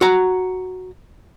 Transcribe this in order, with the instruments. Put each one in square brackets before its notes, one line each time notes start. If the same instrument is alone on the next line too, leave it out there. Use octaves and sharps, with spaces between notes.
[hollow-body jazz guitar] F#4 A#5